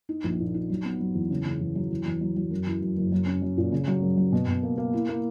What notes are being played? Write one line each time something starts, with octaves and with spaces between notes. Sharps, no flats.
D#4
A#1
A#2
D#4
F#3
B3
F#3
E2
C#3
C#3
E2
F#3
E2
E2
F#3
F#3
F#2
E3
F#2
F#1
F#3
C#4
F#3
A#2
C#3
F#3
F#2
F#3
B2
B2
A#3
A#3
E4
A#3